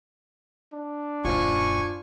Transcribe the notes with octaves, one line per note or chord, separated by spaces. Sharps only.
D4
D#1 F#2 F4 C5 G#5 C#6